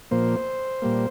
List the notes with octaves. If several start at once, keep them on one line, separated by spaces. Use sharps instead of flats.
A#2 F3 A#3 C5
A#2 G3 A#3